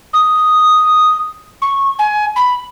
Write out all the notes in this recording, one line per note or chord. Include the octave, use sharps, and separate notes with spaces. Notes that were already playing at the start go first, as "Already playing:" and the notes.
D#6
C#6
G#5
B5